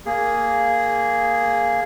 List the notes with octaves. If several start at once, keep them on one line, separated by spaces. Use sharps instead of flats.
A#3 G#4